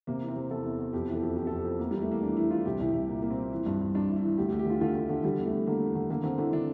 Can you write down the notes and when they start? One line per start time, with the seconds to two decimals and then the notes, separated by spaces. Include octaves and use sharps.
0.07 C3 A#3
0.22 E3
0.28 C4
0.36 C3
0.50 E2 A4
0.65 E2
0.79 E2
0.93 F2 G4
1.08 E3
1.15 A4
1.23 F2
1.36 F2 G4
1.47 F2 A4
1.58 G4
1.65 F2
1.79 E2 A#3
1.91 E3 G3
2.01 A3
2.08 E3 A#3
2.23 E3 D4
2.36 E3 E4
2.51 E3 F4
2.65 C2 G4
2.80 C2 E4
2.94 C2
3.08 A#2 A#3
3.22 A#2 A#3
3.31 C4
3.37 A#2
3.52 E3
3.66 G2
3.81 G2
3.95 G2 D4
4.09 E3
4.16 E4
4.23 E3
4.38 D2 G4
4.49 G4
4.52 D2
4.59 G4
4.66 D3 F4
4.81 D3 F4
4.95 D3
5.09 D3
5.24 D3 G3
5.38 E2
5.46 A3
5.52 E2
5.67 D3 A#3
5.82 E2
5.95 D3
6.10 D3 A#3
6.24 D3 C4
6.38 D3 E4
6.53 D3 D4